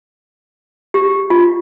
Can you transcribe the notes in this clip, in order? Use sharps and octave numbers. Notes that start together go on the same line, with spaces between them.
G4
F4